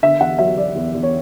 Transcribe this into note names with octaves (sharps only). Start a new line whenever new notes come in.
D3 E5
E2 F#5
F#3 E5
F#3 D5
E2
E2
C#5